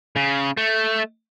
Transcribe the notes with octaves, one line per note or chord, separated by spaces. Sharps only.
C#3
A3